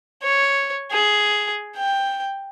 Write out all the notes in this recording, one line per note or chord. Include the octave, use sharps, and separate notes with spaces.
C#5
G#4
G5